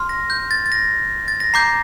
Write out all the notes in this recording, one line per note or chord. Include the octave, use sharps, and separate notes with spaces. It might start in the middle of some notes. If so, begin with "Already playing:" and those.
Already playing: C6 F6
A#6
G6
A6
A6
A#6
A6
A#6
A#5 D6 G6 C7